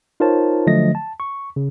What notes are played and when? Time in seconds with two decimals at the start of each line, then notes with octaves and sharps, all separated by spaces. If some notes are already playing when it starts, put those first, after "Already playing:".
0.20 D#4 F4 A#4 C5 C#5 A5
0.67 D3 F3 F#3 A3 D#5 A#6
0.95 A5
1.20 C#6
1.56 C#3